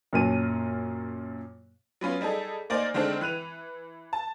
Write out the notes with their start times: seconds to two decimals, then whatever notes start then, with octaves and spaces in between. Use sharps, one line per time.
0.13 F#2 A#2 A#4 C#5 A5 D#7
2.01 F#3 B3 C#4 F4
2.21 G3 D#4 G#4 A4
2.70 A#3 D#4 A#4 C5 D5 G#5
2.94 D3 D#3 G#3 C4 D4
3.21 E3 F#6 D#7 F7
4.13 A5